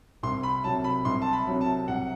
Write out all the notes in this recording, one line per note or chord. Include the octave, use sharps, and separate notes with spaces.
C2 C6
B5
C3 F#3 A5
B5
C2 C6
A5
B5
C3 F#3
A5
C2 F#5